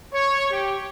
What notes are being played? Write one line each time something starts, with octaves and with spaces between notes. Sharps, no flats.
C#5
G4